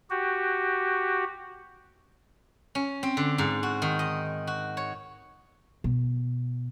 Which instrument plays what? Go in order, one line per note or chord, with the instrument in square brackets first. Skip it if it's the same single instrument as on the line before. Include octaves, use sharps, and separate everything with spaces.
[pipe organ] F#4 G4
[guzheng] C#4
C4
D3
G#2
F#4
D#3
D#5
F#4
C#5
[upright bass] B2